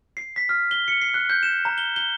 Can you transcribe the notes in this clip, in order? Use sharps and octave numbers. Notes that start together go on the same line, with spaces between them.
C7
B6
F6
G7
C#7
C7
F#6
G6
E7
A#5
G7
G7